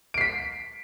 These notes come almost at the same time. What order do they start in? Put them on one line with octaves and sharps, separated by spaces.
D7 C7 B6